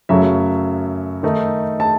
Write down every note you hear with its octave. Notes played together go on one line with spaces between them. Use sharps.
F#2 C#3 F#3 A3 E5
D#3 A3 D#4
A5